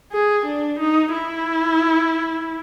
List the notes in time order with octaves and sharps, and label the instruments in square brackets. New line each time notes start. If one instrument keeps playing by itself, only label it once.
[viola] G#4
D4
D#4
E4